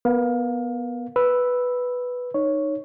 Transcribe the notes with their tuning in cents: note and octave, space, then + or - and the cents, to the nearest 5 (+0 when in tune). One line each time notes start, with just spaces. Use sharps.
B3 -15 A#4 +0 F5 +25
B4 +0 E6 +0
D#4 -15 C#5 +0